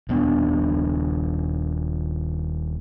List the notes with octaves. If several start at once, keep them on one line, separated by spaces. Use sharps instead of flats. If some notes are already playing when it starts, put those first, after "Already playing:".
D#1 B3 D4